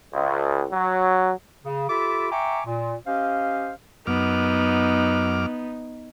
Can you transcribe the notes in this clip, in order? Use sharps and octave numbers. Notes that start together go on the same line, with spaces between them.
C#2
F#3
C#3
F4 G4 A4 E5 B5 D6
E5 G5 G#5 A#5 C#6 D6
A#2
C#4 G4 C5 D#5 F5
F#2 B3 D#4 D6 F6